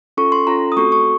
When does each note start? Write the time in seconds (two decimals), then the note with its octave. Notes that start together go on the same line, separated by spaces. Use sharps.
0.17 C#4 F4 A4 C#6
0.32 C6
0.47 C#4 F4 A4 A#5
0.72 D#6
0.77 A3 C4 F#4 A4 C#6
0.92 C#6